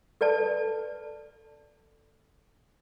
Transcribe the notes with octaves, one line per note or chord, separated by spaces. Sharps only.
A4 B4 D5 A5